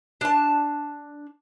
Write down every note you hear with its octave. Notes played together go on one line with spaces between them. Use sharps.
D4 A5